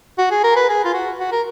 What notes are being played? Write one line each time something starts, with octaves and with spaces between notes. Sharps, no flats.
F#4
G#4
A#4
B4
G#4
F4
F#4
F#4
A#4